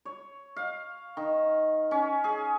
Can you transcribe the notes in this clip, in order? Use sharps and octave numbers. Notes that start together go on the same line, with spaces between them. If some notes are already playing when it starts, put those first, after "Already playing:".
C#5
F5
D#3
C#4
G#4